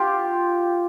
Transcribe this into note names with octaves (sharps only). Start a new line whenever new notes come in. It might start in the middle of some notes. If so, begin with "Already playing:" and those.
Already playing: F4 G4